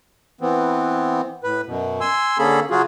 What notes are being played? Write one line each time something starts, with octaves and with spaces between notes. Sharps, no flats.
E3 B3 C4
A2 B4
F#2 B2
G#5 C6 E6
D3 A#3 C#4 G#4 A4 B5
C#3 F#3 F4 F#4 G#4